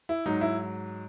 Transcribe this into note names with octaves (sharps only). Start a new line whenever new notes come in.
E4
G#2 F#3 D#4
E4